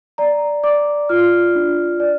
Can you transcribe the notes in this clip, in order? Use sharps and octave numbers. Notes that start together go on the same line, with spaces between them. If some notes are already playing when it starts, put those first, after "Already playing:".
D5 A#5
D5 D6
F4 F6
D4
D5